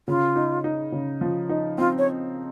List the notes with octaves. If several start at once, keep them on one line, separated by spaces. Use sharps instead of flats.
C#3 F4
D#4
D#4
C#3
F3
D#4
C4 F4
C#5